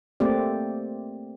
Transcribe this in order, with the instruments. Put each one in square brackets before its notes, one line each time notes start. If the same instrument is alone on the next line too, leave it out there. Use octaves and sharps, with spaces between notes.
[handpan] A3 A#3 C4 G4 D5